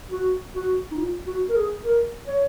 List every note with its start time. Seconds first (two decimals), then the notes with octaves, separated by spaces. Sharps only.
0.11 F#4
0.55 F#4
0.91 D#4
0.98 F4
1.27 F#4
1.49 A#4
1.56 G#4
1.84 A#4
2.27 C#5